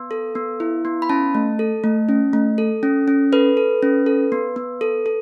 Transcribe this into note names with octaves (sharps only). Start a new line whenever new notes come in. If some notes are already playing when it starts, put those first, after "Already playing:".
Already playing: B3
A4
B3
E4
B3
B5
C#4 A5
A3
A4
A3
C#4
A3
A4
C#4
C#4
A4 B4
A4
C#4
A4
B3
B3
A4
A4